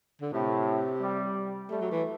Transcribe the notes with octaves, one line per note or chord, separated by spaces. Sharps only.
D3
A2 C3
G3
G3 A3
F#3
E3